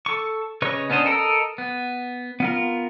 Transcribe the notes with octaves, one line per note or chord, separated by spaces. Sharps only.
A4 C#6
C#3 B4 C#5 D#5 C#6
B3 C#4 D4 C5 D#5
A4 A#4 D#5 E6
B3
B3 F4 A#4